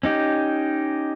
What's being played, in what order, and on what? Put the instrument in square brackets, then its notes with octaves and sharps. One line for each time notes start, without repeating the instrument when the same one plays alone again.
[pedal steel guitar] C#4 D#4 G4